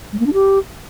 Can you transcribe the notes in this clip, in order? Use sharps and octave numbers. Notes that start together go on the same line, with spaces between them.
G#3
A#3
D4
G4